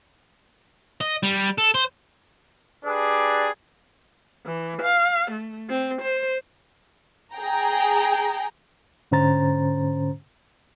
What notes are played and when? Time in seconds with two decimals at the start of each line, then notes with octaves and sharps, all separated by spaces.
1.01 D#5
1.23 G3
1.58 A4
1.75 C5
2.85 D4 G4 G#4 B4 D5
4.46 E3
4.82 F5
5.31 A3
5.69 C4
6.02 C5
7.33 G#4 G5 A#5
9.11 G#2 D3 C#4 C5 A#5 A6